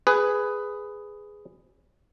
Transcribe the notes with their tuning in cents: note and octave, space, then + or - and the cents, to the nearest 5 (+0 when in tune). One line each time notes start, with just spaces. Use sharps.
G#4 +0 B4 +10